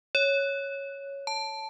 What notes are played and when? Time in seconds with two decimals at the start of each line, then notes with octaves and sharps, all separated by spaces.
0.15 C#5
1.27 A5